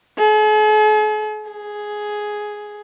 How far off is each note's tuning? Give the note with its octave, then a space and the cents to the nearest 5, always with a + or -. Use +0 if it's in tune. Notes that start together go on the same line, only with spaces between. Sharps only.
G#4 +45
G#4 +5